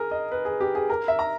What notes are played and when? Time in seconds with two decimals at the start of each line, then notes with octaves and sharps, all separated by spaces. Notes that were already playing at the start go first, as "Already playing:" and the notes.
Already playing: G#4 A#4
0.11 D#5
0.32 B4
0.45 G#4
0.60 G4
0.75 G#4
0.90 A#4
1.08 E5
1.19 A#5